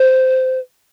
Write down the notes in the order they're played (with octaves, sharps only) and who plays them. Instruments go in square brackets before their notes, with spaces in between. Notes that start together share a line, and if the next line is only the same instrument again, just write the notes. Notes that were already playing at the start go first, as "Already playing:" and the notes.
Already playing: [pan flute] C5